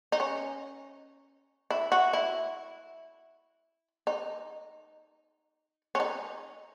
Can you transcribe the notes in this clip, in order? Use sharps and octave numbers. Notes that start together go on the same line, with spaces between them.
D#4
C#4
E4
F#4
E4
D#4
C#4
D#4